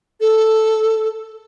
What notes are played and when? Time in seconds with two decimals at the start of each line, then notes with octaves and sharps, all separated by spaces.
0.21 A4